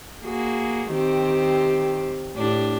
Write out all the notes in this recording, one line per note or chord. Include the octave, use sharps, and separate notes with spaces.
A#3 F#4 G#4
D#3 C4 G4
A2 D4 G4